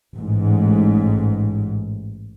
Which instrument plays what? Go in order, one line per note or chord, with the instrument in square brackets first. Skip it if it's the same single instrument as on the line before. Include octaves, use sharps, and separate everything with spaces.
[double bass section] A1 G#2